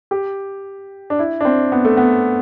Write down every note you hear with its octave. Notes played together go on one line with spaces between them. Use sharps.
G4
D4
E4
D4
C4
B3
A3
B3